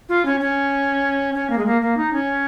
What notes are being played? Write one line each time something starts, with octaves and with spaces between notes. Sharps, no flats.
F4
C#4
C#4
C#4
A#3
G#3
A#3
A#3
D#4
C#4